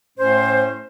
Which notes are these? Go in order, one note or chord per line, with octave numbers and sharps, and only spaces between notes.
A2 A3 C#4 C5